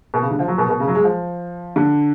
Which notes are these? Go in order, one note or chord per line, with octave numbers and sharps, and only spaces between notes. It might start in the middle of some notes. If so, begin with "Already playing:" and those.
B2
C#3
D3
F3
F#3
B2
B2
C#3
F#3
G#3
F3
D3